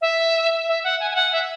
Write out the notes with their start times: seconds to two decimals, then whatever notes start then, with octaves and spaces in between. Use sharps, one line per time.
0.01 E5
0.67 E5
0.84 F#5
1.00 G#5
1.10 G#5
1.15 F#5
1.32 E5